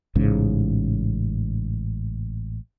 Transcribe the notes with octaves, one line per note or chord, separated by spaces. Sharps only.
A1 G#2 C#3